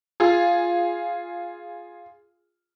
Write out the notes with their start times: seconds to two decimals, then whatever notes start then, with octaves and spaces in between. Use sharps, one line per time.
0.20 F4 G#4